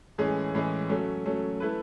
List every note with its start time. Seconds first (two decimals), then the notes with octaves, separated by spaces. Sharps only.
0.18 A2 E3 G#3 C#4 G#4
0.54 A2 E3 G#3 C#4 G#4
0.89 F#3 A3 C#4
1.26 F#3 A3 C#4
1.60 A3 E4 B4